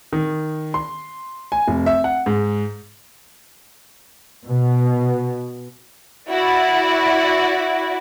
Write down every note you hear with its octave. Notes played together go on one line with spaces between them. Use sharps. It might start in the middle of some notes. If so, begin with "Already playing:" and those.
D#3
C6
G#5
F1
E5
F#5
G#2
B2
E4 F#4 D5